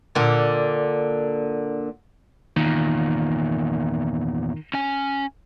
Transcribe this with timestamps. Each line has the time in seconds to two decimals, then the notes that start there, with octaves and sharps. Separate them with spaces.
0.15 A#2 D3
2.56 E2 A#2 D#3
4.74 C#4 G#5